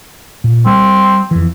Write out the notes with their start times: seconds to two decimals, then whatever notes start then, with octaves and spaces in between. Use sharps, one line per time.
0.44 A#2
0.66 G3 C4
1.31 F2 E3